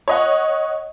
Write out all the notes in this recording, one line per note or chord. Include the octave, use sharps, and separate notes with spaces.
C#5 D#5 F#5